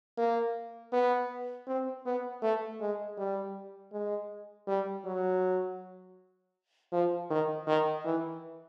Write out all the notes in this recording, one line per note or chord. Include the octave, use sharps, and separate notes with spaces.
A#3
B3
C4
B3
A3
G#3
G3
G#3
G3
F#3
F3
D#3
D#3
E3